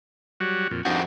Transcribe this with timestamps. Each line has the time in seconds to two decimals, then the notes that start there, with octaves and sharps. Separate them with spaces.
0.40 F#3 G3 F#4
0.71 F2 A#2
0.85 F2 C4 D4 D#4 F#4 G4